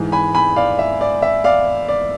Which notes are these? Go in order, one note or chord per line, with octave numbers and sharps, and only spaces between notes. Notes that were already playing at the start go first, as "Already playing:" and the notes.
Already playing: G#2 E3 G#3
G#5 B5
G#5 B5
D5 F5
E5
D5
E5
D5 F5
D5